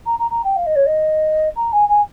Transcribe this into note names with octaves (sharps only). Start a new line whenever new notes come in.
A#5
A#5
A#5
G5
F5
D#5
C#5
D#5
A#5
G#5
G#5